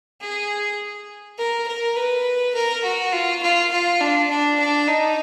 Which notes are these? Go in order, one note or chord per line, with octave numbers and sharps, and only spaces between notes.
G#4
A#4
A#4
B4
A#4
F#4
F4
F4
F4
D4
D4
D4
D#4